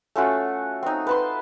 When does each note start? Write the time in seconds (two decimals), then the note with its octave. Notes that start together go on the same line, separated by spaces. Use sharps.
0.16 A3 C#4 F4 F#4
0.83 C4 D#4
1.07 B4 A5 C6